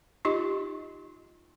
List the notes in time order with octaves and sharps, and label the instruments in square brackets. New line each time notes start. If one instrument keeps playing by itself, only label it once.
[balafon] D#4 F4 G4 D#5 C6